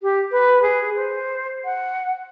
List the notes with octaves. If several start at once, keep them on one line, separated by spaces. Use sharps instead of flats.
G4
B4
G#4
C5
F#5